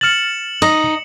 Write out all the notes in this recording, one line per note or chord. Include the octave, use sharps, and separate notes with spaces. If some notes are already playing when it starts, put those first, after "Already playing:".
F6 A6 C#7 E7 F#7
D#4 D#5